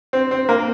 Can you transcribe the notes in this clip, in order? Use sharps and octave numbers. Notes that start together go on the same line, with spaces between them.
C4
C4
A#3